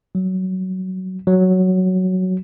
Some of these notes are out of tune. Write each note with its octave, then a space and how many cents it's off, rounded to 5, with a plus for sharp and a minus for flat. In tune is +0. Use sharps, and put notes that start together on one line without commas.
F#3 +15
F#3 +5